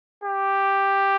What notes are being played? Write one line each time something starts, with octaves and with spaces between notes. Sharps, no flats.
G4